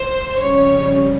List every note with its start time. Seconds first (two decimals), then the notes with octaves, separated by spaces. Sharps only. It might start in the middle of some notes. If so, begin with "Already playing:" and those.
Already playing: C5
0.38 F2 C#3 G3 C#4 C#5